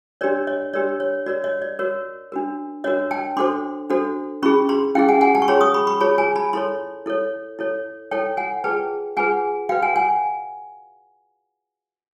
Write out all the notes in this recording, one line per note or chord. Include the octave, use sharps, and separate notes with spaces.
D4 G4 A#4 C#5 D5
C#5 D#5
D4 G4 A#4 C#5 D5
C#5
F#4 A#4 C#5 D5
C#5 D#5
D5
F#4 A#4 C#5
D4 F#4 A#4
D4 F#4 A#4 C#5 D#5
G5 A5
D4 F#4 A4 C5 C6 D6
D4 F#4 A4 C5
C#4 E4 G#4 B5 C#6
A#5 C6
C#4 E4 G#4 F5 G5
F#5 G#5
F#5 G#5
G5 A5
C#6
F4 G#4 C#5 A#5 C6
C#6 D#6
B5 C#6
B5 C#6
F4 G#4 C#5 A5 B5
G#5 A#5
A5 B5
E4 A4 C#5 A#5 C6
E4 A4 C#5
E4 A4 C#5
E4 A4 C#5 G5 A5
F#5 G#5
F4 G#4 B4 G5 A5
F4 G#4 B4 F#5 G#5
F#4 B4 F5 G5
F#5 G#5
F#5 G#5